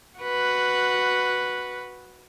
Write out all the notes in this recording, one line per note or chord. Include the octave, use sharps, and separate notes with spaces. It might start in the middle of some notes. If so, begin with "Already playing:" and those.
F#4 B4